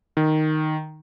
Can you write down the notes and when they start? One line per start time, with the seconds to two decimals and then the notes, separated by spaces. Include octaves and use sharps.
0.17 D#3